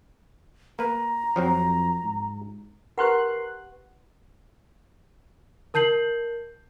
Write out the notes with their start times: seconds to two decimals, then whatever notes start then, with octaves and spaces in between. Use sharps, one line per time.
0.79 A#3 B4 A#5
1.36 F2 F3 F#3 C4
2.03 G#2
2.98 G4 A#4 B4 F#5 C6 F#6
5.74 A#4 A5 G6 C7 F#7